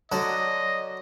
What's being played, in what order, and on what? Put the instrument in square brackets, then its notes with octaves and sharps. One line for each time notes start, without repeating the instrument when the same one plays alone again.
[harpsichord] D3 F#3 A4 [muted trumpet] D#5